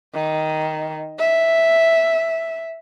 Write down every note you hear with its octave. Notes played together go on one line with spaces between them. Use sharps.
D#3
E5